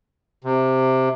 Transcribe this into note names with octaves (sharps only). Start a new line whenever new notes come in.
C3